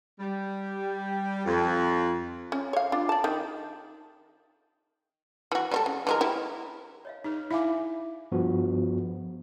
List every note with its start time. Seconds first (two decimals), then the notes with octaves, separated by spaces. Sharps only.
0.19 G3
1.45 F2
2.52 C#4
2.73 C#5 F5
2.92 D4 F4
3.09 D5 A5
3.24 D#3
5.52 E3 F#4
5.71 G3 C4 A4
5.86 C#3
6.07 E3 G#3 A#4
6.21 E4 G4
7.05 C#5 D#5 F5
7.24 D#4 G#4 B4 C#5
7.51 E4 E5 F5 G#5 D6
8.32 G2 F3 B3 F#4